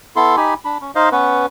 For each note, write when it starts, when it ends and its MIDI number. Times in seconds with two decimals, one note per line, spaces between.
0.16 0.36 59
0.16 0.36 64
0.16 0.36 69
0.16 0.36 84
0.37 0.54 63
0.37 0.54 67
0.37 0.54 80
0.37 0.54 83
0.65 0.78 62
0.65 0.78 83
0.81 0.91 61
0.95 1.09 63
0.95 1.09 72
0.95 1.09 75
0.95 1.09 77
1.12 1.46 59
1.12 1.46 61
1.12 1.46 71